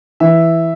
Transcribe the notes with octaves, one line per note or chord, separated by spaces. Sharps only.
E3 E5